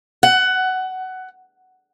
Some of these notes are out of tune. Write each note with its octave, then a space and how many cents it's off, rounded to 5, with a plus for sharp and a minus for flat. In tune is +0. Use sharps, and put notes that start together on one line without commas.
F#5 +15